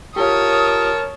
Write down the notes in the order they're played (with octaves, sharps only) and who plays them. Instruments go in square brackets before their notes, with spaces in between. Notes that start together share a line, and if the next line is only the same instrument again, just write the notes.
[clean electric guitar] F4 G4 [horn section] A#4 A5 [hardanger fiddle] C#5 [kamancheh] D#6